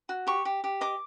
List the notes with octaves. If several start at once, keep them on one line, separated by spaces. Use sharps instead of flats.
F#4
G4 C#6
G4
G4
D#5 D6